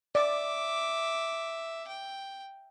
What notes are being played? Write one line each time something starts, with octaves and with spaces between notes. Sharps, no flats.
D5 E5 D6
G5